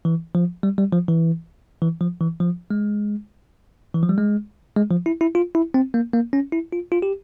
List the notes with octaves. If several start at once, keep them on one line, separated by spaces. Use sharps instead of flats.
E3
F3
G3
G3
F3
E3
E3
F3
E3
F3
G#3
E3
F3
G3
G#3
G#3
F3
E4
E4
F4
E4
C4
A#3
A#3
C#4
E4
F4
F4
G4